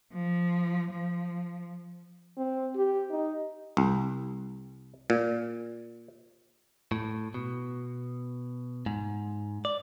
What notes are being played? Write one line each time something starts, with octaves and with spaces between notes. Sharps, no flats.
F3
F3
C4
G4
D#4
C2
A#2
A2
B2
G#2
D5